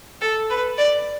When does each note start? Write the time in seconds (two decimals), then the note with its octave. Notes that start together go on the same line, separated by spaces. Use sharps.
0.21 A4
0.50 B4
0.78 D5